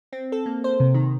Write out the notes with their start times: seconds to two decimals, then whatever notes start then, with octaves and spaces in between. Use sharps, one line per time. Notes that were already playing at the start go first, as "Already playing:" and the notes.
0.13 C4
0.32 A4
0.46 A#3
0.64 C5
0.80 C3
0.94 D#3